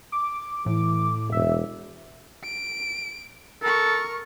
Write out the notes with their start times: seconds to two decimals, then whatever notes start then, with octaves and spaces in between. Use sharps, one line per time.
0.12 D6
0.66 A2 E3
1.32 E1 E5
2.44 D7
3.63 A4 A#4 C#6